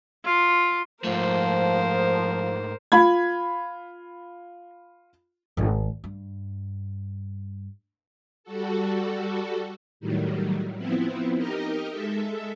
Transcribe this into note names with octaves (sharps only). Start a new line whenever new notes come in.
F4
G#2 F3 A3 A#4 C5
F4 B5 G#6
G#1
G2
G3 F#4 A4
A2 D#3 F#3 G3
F3 B3 C4 E4
D#4 G4 A#4 D#5
G#3 A4 E5